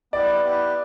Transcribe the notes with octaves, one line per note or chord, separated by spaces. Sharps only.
B3 E4 G4 B4 D5
B3 E4 G4 B4